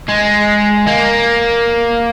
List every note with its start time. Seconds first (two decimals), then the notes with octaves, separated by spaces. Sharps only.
0.08 G#3
0.87 A#3